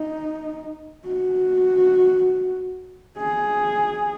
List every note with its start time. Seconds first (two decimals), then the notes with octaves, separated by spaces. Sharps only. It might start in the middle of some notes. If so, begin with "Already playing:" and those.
Already playing: D#4
1.06 F#4
3.18 G#4